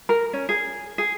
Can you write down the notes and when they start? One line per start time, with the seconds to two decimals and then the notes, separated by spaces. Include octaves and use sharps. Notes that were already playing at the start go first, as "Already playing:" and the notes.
0.09 A#4
0.33 C#4
0.49 G#4
0.98 G#4